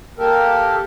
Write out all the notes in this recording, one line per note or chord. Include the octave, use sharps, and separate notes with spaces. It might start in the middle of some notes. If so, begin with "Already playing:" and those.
A#3 G4 A4 A#4